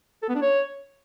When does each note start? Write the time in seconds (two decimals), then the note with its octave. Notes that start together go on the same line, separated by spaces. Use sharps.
0.23 A4
0.29 B3
0.35 D4
0.42 C#5